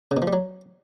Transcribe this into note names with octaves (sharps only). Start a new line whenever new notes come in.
C#3
B2
F3
G3
F#3